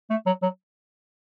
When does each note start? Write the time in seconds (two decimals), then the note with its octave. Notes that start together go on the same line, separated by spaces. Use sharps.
0.10 A3
0.26 F#3
0.42 F#3